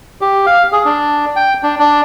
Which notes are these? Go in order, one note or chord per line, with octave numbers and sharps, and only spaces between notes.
G4
F5
G#4
D4
G5
D4
D4